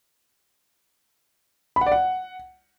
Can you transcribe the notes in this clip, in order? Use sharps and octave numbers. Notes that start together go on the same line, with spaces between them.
B5
F#5
D5
F#5